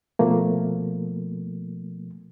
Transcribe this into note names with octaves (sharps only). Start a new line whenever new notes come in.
B2 F3 A3 A#3